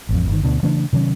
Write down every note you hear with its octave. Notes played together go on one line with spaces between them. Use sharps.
A1 F2
G1 D#3
D2 B2 D3
C#3 E3 A3 D4
C3 D#3 F#3 C#4